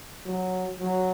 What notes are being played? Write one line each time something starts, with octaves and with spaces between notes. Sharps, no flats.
F#3
F#3